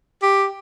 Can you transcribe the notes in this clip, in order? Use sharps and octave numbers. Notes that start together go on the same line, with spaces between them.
G4